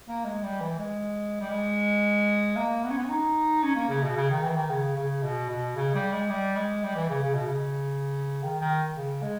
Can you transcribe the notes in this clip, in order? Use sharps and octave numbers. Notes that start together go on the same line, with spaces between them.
A#3
G#3
G3
E3
G#3
G3
G#3
A#3
B3
C#4
B3
C#4
D#4
C#4
A#3
C#3
B2
C#3
D#3
E3
D#3
C#3
C#3
B2
B2
C#3
G3
G#3
G3
G#3
G3
E3
C#3
C#3
B2
C#3
D#3
D#3
C#3
G#3